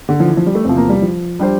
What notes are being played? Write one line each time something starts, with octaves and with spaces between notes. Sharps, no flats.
D3
F3
E3
F3
G3
A3
E2 C3 F3 C4
A#3
G3
F3
G3 D4 G4 C5